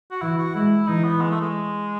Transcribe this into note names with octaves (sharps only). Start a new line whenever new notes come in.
F#4
E3 E4
F#4
G#3 E4
E3 D#4
B3
G#3
A3
G#3